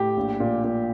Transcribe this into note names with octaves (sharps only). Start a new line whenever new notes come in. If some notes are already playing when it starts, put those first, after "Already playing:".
Already playing: A2 G4
A#1
A#2
A#2